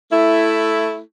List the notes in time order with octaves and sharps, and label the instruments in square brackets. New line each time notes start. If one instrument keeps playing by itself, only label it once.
[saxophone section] A3 E4